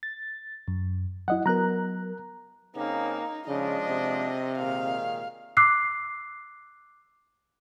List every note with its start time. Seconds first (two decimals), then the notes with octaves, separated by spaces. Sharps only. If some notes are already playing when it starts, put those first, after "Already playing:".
0.03 A6
0.68 F#2
1.28 F#3 E4 D#5 F#5
1.46 F#3 B3 A#4 A#5 F#6
2.76 C#3 A#3 C4 D#4
3.48 C#3 F3 G#3 D4 D#5
3.90 C3
4.58 A#2 D#3 G#3 F5
5.57 D6 E6 F#6 C7